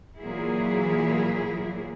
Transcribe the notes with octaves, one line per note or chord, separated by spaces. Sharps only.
A#2 E3 F#3 E4 G#4